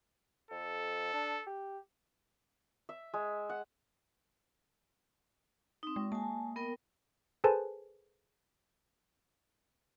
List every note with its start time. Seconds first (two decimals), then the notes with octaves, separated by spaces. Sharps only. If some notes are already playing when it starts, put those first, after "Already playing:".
0.51 F2 A4
1.13 D4
1.47 G4
2.89 E5
3.14 G#3
3.49 F#5
5.83 C4 D#4
5.96 G#3
6.12 A#3 G#5 A5
6.56 B3 A#4 G5
7.44 G#4 A4 B4 C5 G#5 A5